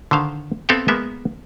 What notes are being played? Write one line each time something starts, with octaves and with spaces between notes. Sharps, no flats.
D3 D#3 C5 F5
B3 C4 A4 E5 F5 G5
G#3 A#3 B3 A#4 E5